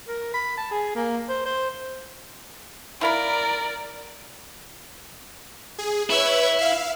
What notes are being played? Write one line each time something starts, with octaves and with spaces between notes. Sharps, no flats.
A#4
B5
A5
G#4
A#3
C5
C5
E4 A#4 D5 F5 B5
G#4
E4 B4 C#5 E6
E5 F5